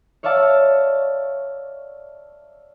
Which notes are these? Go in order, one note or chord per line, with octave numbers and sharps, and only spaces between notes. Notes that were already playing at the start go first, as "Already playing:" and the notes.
C#5 D5 E5 F5 A5